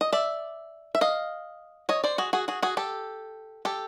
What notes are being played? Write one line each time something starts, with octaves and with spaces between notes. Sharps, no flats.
D#5
D5 E5
E5
D#5 F5
C#5 D#5
C5 D5
F#4 G#4
F#4 G#4
F#4 G#4
F#4 G#4
G4 A4
G4 A4